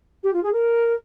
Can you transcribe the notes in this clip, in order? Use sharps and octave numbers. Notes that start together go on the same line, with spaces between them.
G4
F4
G#4
A#4